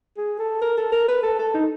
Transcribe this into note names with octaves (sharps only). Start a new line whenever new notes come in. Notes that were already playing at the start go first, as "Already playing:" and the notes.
G#4
A4
A#4
A4
A#4
B4
A4
A4
D#4